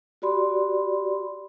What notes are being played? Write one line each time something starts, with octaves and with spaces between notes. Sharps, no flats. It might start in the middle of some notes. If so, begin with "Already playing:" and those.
F#4 G4 D5 B5 C6